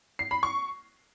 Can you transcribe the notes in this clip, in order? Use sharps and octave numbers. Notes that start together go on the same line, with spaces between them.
C7
B5
C#6